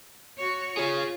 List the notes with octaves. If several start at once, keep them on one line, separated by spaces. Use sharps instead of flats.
F#4 C#5
F4 G#4 C#5